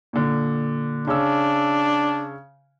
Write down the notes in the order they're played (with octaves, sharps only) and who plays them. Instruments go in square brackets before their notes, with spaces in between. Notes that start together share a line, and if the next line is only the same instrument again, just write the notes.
[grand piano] A#2 D3
[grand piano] C#3 E6 [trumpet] D4